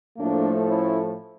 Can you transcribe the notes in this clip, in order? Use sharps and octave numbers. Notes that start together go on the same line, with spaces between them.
A2 F3 A3 A#3 D4
C#4 E4